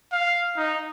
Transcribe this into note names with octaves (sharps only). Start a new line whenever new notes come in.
F5
D#4